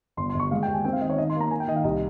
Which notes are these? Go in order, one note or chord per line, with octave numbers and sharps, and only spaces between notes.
G1 C6
C6
G1
C#6
G#3 F5
G5
D#2
G#5
C4 G5
F5
D#3 D#5
C#5
D#3 D#5
C6
A#3
A#5
A#3 G#5
G5
D#3 D#5
F5
C2 D#5